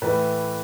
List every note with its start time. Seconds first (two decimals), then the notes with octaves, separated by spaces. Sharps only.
0.02 A2 E3 A3 B4